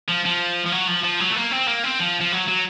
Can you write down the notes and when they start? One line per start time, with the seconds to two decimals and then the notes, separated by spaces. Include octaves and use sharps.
0.09 F3
0.26 F3
0.66 F3
0.72 F#3
0.88 F3
1.04 F3
1.20 F#3
1.31 A3
1.37 A#3
1.52 C4
1.68 A#3
1.84 C4
2.00 F3
2.21 F3
2.32 F#3
2.48 F#3